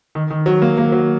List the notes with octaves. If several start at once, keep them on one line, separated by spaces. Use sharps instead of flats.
D#3
D#3
F#3
A#3
A#3
F#3